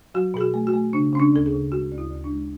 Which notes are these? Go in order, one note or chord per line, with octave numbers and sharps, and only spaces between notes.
F#3 F#4
B2 G#4
F#4
A3
F#4
A3
C#3 D4
C#3 C#4
D4
D2 A4
G#4
C#3
G#3 F#4
D2
E4
D2
D4
G#3